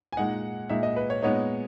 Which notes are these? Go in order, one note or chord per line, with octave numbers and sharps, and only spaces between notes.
G#5
A#2 G#3 D#4 F#5
A#2 G#3 D#4 E5
D#5
B4
C#5
A#2 G#3 B3 D#4 C#5